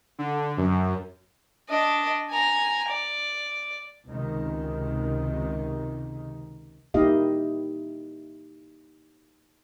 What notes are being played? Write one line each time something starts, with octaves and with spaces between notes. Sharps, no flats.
D3
F#2
D4 D#5
G#5 A#5
D5
C#2 C3 D#3
A#3 D#4 E4 G4 D#5 F5